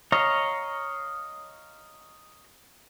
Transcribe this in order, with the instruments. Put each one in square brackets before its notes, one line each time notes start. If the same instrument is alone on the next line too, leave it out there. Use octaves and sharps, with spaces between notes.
[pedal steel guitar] C#5 D#5 F5 A#5